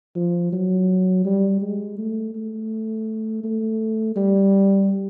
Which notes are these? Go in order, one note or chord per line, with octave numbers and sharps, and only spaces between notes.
F3
F#3
G3
G#3
A3
A3
A3
G3